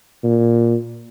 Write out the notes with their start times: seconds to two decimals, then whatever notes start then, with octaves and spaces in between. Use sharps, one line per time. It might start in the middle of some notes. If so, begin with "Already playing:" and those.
0.24 A#2